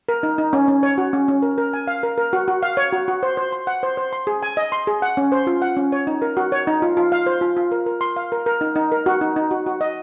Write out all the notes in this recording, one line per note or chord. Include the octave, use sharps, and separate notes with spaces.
A#4
D#4
D#4
C#4
C#4
C#5
F#4
C#4
C#4
A#4
A#4
G#5
F5
A#4
A#4
F#4
F#4
F5
C#5
F#4
F#4
C5
C5
C6
F#5
C5
C5
C6
G#4
G#5
D#5
C6
G#4
F#5
C#4
C5
F4
F#5
C#4
C#5
D#4
A#4
F#4
C#5
D#4
F4
F4
F5
C5
F4
F4
A#4
A#4
C6
F5
A#4
A#4
D#4
D#4
A#4
F#4
D#4
D#4
F#4
F#4
D#5